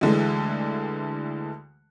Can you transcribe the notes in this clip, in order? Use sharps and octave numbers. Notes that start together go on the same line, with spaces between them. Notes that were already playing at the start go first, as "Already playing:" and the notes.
D2 D3 E3 G#3